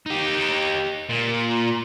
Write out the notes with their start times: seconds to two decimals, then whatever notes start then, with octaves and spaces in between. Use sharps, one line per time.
0.06 D#4 G4
1.09 A#2